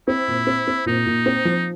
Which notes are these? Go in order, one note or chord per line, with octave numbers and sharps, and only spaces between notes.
C4 E4
A#2
C4
C4
A#2 D#4
A#2
C4
F3